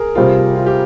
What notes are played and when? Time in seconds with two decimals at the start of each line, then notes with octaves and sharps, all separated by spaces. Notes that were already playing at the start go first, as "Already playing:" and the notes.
Already playing: G#4 A#4
0.15 C3 G3 C4 F4
0.56 F4
0.66 G4